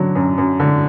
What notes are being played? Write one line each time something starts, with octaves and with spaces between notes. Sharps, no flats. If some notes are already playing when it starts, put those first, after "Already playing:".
Already playing: D3 F#3
F#2
F#2
D3